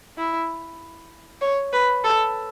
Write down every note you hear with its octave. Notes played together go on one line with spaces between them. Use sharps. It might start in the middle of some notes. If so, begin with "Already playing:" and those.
E4
C#5
B4
A4